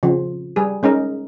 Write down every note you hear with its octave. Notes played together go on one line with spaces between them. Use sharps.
C#3 F3
G3 G#4
G#3 C#4 D#4 A#4